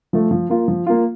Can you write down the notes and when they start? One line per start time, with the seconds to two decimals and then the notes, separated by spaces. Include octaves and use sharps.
0.13 F3 A3
0.31 F3
0.50 A#3 F4
0.68 F3
0.86 A#3 F4